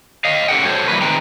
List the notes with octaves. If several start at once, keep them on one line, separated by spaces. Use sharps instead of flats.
D#5 F5
C#4 G4 A4 F#5 G5
F#4 A4 C5 C#5
E3 G3 A#3 B4
D#3 G#3 C4 B4 G5 A#5